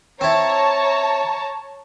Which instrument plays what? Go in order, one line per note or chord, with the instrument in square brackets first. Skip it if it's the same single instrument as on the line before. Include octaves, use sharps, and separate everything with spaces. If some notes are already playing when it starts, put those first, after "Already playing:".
[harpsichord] C4 E4 [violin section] C#5 A5 A#5